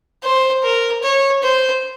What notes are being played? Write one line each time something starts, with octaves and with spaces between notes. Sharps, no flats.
C5
A#4
C#5
C5